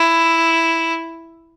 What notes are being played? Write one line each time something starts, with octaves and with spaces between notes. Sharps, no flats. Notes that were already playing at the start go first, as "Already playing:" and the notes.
Already playing: E4